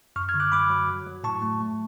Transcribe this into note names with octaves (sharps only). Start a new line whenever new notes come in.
F#2 C#6 F6
F6 G#6
D3
D6 F#6
F#3 B5 D6
F#3
F#3
F#3
A2 A5 C#6
A3
A3